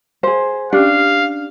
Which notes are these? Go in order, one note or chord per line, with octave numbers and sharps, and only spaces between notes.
G#4 C5 F5
C#4 D4 G4 F5